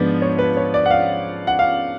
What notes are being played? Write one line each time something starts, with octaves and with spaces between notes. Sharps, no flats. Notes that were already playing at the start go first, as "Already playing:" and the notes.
Already playing: G#2 F3 B3 D4
C#5
B4
C#5
D5
F#5
F5
F#5
F5